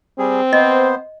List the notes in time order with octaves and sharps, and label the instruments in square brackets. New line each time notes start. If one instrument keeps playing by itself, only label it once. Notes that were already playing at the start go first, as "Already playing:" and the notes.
[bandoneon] G3 G#4 [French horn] C4
[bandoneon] B3 C5 [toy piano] D#5